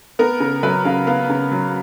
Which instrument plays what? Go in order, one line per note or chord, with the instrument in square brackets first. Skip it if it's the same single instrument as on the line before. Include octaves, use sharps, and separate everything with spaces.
[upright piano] B3 A#4
C#3
F#3 B4
C#3 F5
B3 F5
C#3
F#3